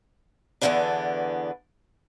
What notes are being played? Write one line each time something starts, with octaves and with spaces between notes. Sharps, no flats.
E2 G2 D3 E3 B3 D4